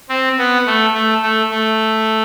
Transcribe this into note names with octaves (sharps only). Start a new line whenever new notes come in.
C4
B3
A3
A3
A3
A3